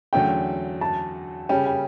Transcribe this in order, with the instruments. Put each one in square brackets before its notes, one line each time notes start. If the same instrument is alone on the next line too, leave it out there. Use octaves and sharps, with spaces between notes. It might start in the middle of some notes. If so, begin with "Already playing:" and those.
[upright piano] E2 D3 F#3 A3 C#4 [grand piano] G5
[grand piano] A5
[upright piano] C#3 G3 C#4 [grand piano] G5
[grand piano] G5